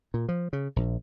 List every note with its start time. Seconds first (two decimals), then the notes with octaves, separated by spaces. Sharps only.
0.14 A#2
0.29 F3
0.53 C#3
0.76 A#1